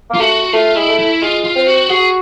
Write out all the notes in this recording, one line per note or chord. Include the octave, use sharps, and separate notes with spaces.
A#3
F4
A3 F#4
A3 F4
G#3 E4
A3
E4
G#3 F4
F4
C4
F#4
F#4 G#4